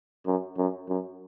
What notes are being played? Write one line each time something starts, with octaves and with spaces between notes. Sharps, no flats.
F#2
F#2
F#2